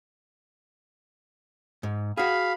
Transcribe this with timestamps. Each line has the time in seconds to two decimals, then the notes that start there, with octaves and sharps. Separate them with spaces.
1.83 G#2
2.17 F#4 G#4 F5 B5